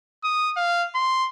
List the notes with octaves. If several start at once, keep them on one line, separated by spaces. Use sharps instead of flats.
D#6
F5
C6